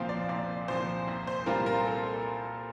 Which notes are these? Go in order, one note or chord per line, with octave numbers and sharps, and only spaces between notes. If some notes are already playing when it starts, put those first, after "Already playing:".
Already playing: C2 A#2 F3 C4 C5 F5
D5
C2 D5
A#2 F3 C4 C5
C2
C5
A#2 G3 C4 F4 A#4
A#4
A4